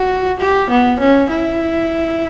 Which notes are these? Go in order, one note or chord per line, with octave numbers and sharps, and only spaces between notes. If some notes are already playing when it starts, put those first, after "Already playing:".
Already playing: F#4
G4
B3
C#4
E4